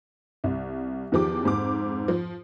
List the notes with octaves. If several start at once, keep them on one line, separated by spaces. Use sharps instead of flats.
C2
E2 D#3 F3 G4 D6
F2 G#2 D6
F3